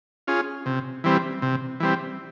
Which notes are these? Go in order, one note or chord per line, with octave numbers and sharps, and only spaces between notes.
C#4 F4 G#4
C3
E3 G3 C4
C3
E3 G3 C4